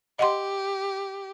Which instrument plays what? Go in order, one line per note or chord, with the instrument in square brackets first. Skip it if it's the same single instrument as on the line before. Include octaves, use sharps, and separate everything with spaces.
[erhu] G4 [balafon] D#5 F#5 C6